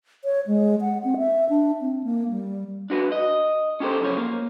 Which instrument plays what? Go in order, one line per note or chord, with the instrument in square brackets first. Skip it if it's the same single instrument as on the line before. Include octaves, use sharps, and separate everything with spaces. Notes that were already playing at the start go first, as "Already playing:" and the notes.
[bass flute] C#5
G#3
F#5
C4
E5
D4
C4
A#3
G3
[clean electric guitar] D4 F#4 B4
D#5
C#4 F4 G4 A4 A#4 C5
F#2 C#3 F3 C#5
A#3